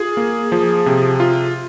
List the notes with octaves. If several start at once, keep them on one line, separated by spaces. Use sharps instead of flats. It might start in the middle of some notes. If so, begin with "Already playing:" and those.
Already playing: F4 G#4
A#3
F3
C3
F4